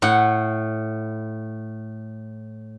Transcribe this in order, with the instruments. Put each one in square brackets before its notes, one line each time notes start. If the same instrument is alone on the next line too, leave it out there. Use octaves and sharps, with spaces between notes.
[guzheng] A2 F#5